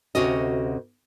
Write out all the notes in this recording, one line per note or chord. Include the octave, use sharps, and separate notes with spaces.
D2 C3 C#4 F#4 D#5